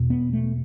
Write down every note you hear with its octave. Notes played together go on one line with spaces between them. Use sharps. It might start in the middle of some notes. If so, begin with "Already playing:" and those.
Already playing: E2 B2
B3
A3